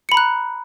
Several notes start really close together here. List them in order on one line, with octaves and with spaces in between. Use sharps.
C#7 B5 A#5 F#6